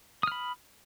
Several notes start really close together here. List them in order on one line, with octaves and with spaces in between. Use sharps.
D#6 F6 B5